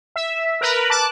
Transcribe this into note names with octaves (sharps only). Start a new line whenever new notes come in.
E5
A#4 B4
A5 D6 F#6